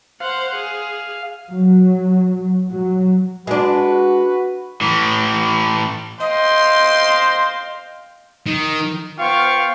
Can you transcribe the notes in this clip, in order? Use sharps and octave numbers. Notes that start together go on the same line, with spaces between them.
C5 F5 F#5
G#4
F#3
F#3
G#3 D4 F#4 B4
A2 E3
C5 D#5 F5 G5 C6
D#3
B3 F4 C5 F5 G5 C#6